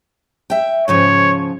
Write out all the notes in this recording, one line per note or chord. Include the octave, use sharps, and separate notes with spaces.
E5 G5
G#2 C#3 F3 C#5